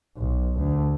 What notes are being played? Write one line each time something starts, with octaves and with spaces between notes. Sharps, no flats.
B1
D2